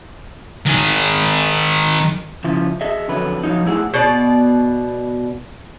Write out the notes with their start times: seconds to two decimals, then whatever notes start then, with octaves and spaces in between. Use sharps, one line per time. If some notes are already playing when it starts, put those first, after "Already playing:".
0.66 D#3 G#4
2.44 C#3 F3 E4
2.81 G#4 D#5 E5
3.08 F2 D3 F#3 B4
3.43 F3 F#3 D#4
3.66 A2 E4 G#4 F#5
3.94 B2 D5